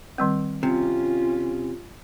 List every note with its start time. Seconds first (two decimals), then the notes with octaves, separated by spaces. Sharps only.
0.18 D#3 G3 C4
0.63 C3 C#4 F4